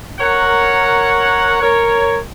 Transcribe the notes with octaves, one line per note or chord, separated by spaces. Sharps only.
A#4 C#5 F#5
A#4 C#5